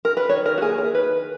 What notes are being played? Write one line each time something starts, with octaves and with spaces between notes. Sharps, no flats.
A#4
B4
D#3 C#5
A#4
F#4
A#3 E4 G#4
A#4
D#3 B4